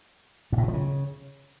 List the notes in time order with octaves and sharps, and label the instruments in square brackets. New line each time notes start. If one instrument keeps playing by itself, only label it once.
[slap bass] G#2
A2
B2
F3
C#3